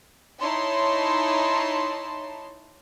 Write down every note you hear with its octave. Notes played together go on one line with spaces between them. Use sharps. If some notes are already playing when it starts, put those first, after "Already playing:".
D#4 E4 C#5 A5 C6